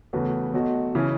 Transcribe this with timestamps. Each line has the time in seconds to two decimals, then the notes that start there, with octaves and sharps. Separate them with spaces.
0.13 E2 C#3 A3 F#4 B4
0.54 B1 B2 A3 F#4
0.95 C#3 E3 C#4 E4